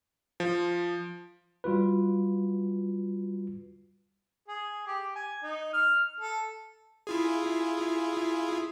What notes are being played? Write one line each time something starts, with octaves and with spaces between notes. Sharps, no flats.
F3
G3 F4 F#4 B4
G#4
G4
G#5
D#4
F6
A4
E4 F4 G#4